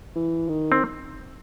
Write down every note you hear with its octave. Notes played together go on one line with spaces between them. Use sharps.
E3
D#3
C4